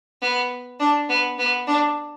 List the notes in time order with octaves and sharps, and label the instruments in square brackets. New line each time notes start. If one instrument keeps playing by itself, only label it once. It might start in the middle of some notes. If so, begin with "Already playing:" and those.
[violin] B3
D4
B3
B3
D4